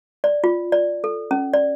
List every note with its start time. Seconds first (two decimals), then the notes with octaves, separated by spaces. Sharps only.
0.24 D5
0.44 F4
0.72 D5
1.04 A4
1.31 C#4
1.54 D5